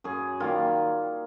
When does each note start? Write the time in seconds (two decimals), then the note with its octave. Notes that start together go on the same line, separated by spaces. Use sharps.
0.04 F#2 G#4
0.40 D#3 G3 A#3 F4